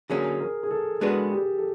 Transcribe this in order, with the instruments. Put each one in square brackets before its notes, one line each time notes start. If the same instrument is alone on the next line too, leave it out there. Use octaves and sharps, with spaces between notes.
[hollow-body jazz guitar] D3 F#3 A#3 C#4 [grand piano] G#4
[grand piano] A#4
G#4
A4
[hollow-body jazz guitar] G#3 B3 D4 F#4 B4 [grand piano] G#4
[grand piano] G4
A4